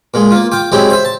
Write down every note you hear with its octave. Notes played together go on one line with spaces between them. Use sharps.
A#2 G#3
A#3 F4
F4 G5 D6
F#3 G#3 C4 E4 G4
C5 E5
A5